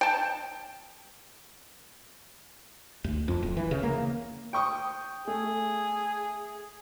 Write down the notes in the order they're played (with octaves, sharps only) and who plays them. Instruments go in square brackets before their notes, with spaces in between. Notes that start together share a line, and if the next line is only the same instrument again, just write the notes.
[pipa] G5 A5
[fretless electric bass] D2
F2
D1
E3
C#3
A#3
[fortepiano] G5 C#6 D#6
[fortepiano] A3 [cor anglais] G#4